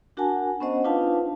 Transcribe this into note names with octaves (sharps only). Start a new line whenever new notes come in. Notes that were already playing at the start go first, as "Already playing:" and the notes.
D4 F#4 A#4 F#5 G#5 A5
B3 C#4 C5 D#5 F#5
D4 D#4 F4 B4 F5 A5